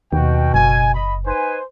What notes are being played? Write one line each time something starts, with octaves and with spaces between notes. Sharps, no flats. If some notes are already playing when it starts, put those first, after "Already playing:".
D#2 B2 F#4 G5
F#1 G#5
D#5 B5
D#4 B4 C5 G#5